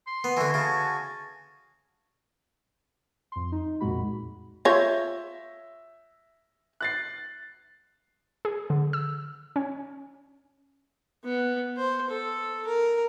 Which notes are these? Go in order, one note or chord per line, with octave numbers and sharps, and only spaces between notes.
C6
B3
D3 E3 F#4 G#5
C#3 A5
F2 C6
D#4
C2 F2 A#2 G#3 F#4 B5
F4 C#5 E5 G6 A#6
F#6 A6 C7
G#4
D3
E6
C#4
B3
C5
A4
A#4